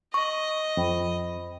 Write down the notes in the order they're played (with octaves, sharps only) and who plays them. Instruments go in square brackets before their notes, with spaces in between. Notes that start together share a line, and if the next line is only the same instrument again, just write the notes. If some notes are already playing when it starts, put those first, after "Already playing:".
[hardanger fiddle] D#5 [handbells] C#6
[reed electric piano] F2 [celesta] C5 G5 B5